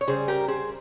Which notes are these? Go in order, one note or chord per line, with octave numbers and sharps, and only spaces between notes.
C#5
C#3 G3 G#4 C5
G4 A#4
G#4 C5